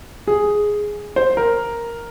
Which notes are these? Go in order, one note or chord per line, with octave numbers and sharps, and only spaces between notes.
G#4
C5
A#4